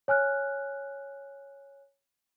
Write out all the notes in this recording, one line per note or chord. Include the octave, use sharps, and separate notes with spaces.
C#5 G#5 F6 F#6